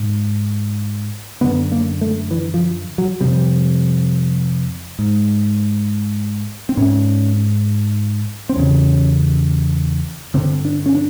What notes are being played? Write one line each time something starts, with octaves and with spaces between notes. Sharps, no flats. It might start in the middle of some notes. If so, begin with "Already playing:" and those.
Already playing: G#2
F#2 D3 B3
A#3
A3
E3
F3
F#3
F2 C3 G3
G#2
C4
G#2 C#4
C4
E2 C#3 C#4
G2 D3 C4
D4
C#4
D4